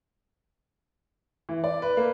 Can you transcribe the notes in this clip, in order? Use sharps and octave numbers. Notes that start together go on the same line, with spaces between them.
E3
D5
B4
A#3